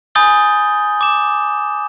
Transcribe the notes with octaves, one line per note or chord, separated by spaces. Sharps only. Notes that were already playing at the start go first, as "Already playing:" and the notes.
G#5 B5 D#6 G6 A6 G7
D6 E7